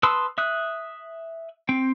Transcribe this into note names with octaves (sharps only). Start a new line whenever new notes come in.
B4 A5 C6 D#6 E6
E5 D#6 F#6
C4 G5